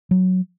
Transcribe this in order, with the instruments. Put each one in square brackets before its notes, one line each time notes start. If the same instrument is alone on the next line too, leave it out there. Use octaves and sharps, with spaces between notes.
[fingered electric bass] F#3